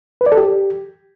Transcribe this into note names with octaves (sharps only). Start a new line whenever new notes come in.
B4
D5
A4
G4